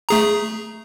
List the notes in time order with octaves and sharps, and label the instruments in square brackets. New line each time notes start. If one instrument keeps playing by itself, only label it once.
[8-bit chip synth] A3 G#4 A#5